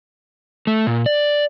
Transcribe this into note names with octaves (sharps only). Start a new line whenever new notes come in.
A3
A#2
D5